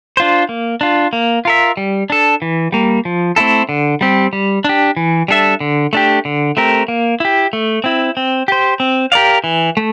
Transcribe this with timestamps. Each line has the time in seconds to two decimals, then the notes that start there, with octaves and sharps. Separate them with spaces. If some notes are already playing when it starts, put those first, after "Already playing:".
0.17 D4 F4 C5
0.49 A#3
0.81 D4 F4
1.13 A#3
1.45 F4 A#4 E5
1.77 G3
2.10 D4 A4
2.42 E3
2.72 G3 A#3
3.05 F3
3.36 A3 C4 E4 A4
3.69 D3
4.01 G3 C4 G4
4.33 G3
4.64 D4 G4
4.97 E3
5.28 G3 D4 A4 E5
5.60 D3
5.93 A3 D4 G4
6.25 D3
6.57 A3 C4 G4 A#4
6.88 A#3
7.20 E4 G4
7.53 A3
7.84 C4 E4
8.17 C4
8.48 G4 C5
8.80 C4
9.12 G4 A#4 D5 F5
9.44 E3
9.77 A3